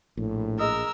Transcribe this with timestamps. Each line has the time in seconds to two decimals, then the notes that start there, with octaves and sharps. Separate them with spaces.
0.17 A#1 A2
0.59 G#4 A#4 D#5 D#6 E6